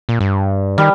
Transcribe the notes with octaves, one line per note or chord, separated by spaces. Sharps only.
A#2
G2
D#3 G3